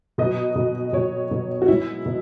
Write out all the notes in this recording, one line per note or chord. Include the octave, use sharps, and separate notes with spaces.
B2 F#3 D#5
B2 F#3
B2 F#3 C#5
B2 F#3
F#4
B2 G#3 E4
B2